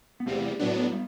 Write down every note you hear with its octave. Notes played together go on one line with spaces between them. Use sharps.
B3
E2 C3 G3 A3 C4
A2 F#3 B3 D4
G3 B3